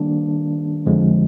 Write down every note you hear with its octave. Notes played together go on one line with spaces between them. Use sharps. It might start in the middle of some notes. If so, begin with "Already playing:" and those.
Already playing: D#3 G3 A#3 D4
F2 D3 F3 G#3